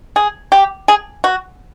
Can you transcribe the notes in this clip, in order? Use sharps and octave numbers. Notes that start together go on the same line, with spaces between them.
G#4
G4
G#4
F#4